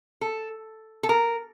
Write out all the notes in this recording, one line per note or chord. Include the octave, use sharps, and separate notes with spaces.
A4
A4
A#4